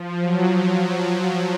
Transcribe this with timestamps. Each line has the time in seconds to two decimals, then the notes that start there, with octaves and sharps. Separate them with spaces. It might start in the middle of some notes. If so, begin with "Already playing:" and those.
Already playing: F3
0.20 F#3